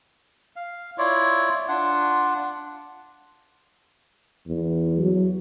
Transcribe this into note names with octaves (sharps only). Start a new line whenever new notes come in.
F5
E4 F4 C#5 D5
D4 F4 F#5
E2
F#3